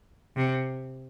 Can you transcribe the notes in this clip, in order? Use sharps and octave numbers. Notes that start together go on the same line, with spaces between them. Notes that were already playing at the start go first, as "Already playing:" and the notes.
C3